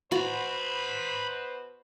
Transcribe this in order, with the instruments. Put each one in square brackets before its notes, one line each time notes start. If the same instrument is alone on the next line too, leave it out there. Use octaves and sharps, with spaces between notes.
[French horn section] B2 B4 C5 [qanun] F#4 [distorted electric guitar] A#5 B5